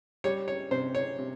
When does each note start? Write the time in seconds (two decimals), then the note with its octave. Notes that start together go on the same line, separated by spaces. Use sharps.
0.24 G3 C#5
0.48 C#5
0.71 C3 C5
0.95 C#5
1.19 C3